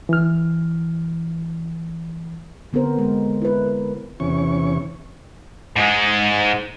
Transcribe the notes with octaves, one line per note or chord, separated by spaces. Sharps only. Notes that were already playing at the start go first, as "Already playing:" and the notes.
E3 F6
D3 B3 C4 A#4 C5
G#3
B3
E4 B4
A#4
E2 C3 E3 C#4 C#6
G#2 G#3